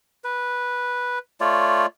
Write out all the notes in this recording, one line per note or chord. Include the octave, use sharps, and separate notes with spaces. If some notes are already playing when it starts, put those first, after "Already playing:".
B4
A3 F4 C#5 D5